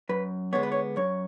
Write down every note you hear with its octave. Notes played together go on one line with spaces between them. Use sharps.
F#2 B4
D3 G#3 B3 C#5
B4
C#5
F#2 C#5